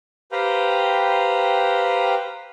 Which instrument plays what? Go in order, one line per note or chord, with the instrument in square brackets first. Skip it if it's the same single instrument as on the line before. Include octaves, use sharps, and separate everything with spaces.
[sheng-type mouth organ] G4 B4 C5 F5 G5 A#5